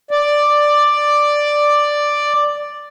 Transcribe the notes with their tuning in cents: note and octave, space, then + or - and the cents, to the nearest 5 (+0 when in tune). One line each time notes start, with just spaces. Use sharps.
D5 +5